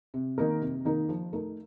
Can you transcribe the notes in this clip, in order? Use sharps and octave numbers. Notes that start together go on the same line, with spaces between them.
C3
D#3 A#3 D#4 A#4
C3
D#3 A#3 D#4 A#4
F3
A3 D#4 A#4